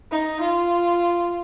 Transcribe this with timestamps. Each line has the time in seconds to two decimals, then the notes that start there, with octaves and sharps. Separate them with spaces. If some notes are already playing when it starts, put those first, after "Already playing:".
0.11 D#4
0.40 F4